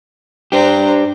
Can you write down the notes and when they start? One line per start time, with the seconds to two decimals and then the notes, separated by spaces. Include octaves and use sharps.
0.52 D4 G4 C5 A#5